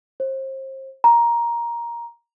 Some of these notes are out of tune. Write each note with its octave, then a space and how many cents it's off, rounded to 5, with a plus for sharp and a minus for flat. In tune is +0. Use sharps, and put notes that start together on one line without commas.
C5 +35
A#5 +10